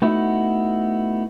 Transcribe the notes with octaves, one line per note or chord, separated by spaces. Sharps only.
A3 B3 D#4 E4 F#4